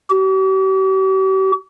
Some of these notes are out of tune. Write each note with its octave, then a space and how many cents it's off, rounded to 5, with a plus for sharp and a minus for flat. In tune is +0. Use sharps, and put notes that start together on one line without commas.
G4 -45